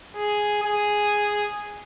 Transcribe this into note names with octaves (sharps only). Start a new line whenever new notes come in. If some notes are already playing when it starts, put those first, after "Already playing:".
G#4
G#4